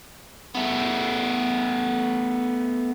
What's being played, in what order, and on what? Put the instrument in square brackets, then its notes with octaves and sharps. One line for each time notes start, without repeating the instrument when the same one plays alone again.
[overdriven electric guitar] A3 B3